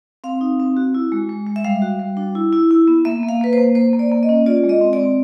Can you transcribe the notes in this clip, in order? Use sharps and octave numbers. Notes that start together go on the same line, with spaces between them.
C4 F5
D#4
C4
F#4
E4
G#3
G#3
G#3
E5
G3 F5
F#4
G3
D4
E4
E4
E4
B3
A#3 E5
A#3
F5
A#3 B4
C5
A#3
A#3 C5
A#3
D5
A#3
D#5
C#4
F4 D5
G#3
D#5
C4
D5
C4